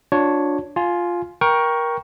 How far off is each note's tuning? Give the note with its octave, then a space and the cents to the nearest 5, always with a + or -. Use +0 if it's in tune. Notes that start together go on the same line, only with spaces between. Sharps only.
D4 +0 F4 +40 C#5 +0
F4 +0 G#5 +25
A#4 +20 G5 +0 C#6 +0